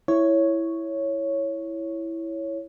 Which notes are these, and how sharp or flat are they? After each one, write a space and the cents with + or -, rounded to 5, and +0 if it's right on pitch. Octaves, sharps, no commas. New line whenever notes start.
E4 +0 C#5 +0